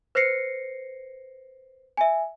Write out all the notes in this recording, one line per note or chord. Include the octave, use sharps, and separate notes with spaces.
B4 C5 A#6 C7 C#7
E5 G#5